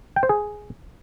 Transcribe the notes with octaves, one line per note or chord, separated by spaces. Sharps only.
G5
C5
G#4